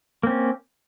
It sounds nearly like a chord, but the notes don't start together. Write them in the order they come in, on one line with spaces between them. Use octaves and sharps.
A#3 C4 C#4